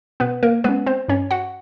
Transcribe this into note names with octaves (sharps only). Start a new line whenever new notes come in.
B2 B3 B4
A#3 A#4
G#3 B3 C#4 B4
C4 C5
G2 C#4 C#5
F#4 F#5